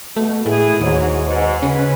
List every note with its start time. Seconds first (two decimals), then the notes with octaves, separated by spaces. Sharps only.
0.16 B2 A3
0.46 A2 E3 E4 G#4
0.80 D#2 G#2 F#3
1.26 G#2 B2
1.63 C#3 C#4 B4